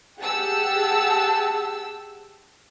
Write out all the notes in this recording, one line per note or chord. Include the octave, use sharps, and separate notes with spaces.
G4 G#4 F#5 A5 E6